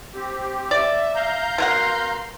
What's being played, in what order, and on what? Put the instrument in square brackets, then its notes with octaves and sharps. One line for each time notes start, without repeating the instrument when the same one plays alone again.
[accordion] C4 G4
[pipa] D5 [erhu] E5
[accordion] F5 A#5 G6
[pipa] B2 A#4 F#5 [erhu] C6